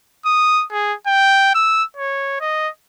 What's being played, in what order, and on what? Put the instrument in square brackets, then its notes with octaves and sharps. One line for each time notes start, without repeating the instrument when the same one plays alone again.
[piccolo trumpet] D#6
G#4
G5
E6
C#5
D#5